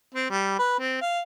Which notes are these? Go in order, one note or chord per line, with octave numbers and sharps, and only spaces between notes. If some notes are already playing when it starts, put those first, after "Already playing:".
C4
G3
B4
C4
F5